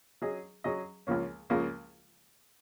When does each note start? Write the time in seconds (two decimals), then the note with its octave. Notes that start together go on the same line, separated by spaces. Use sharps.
0.22 F#3 C#4 G#4 D#5
0.64 F#3 C#4 G#4 D#5
1.07 C#2 C#3 F3 A#3 C#4
1.50 C#2 C#3 F3 A#3 C#4